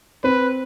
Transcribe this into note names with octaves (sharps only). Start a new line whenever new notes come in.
C4 B4